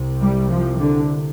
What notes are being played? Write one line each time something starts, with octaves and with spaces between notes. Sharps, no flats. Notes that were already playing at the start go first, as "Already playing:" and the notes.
Already playing: C2 C3
G3
F3
D3